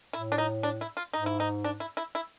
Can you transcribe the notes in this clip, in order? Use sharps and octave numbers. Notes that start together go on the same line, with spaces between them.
A2 E4
D4
D#4
D4
E4
F4
G#2 D#4
E4
D#4
D4
E4
E4
E4